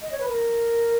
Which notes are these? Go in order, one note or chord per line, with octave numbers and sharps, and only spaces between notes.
D#5
C#5
B4
A#4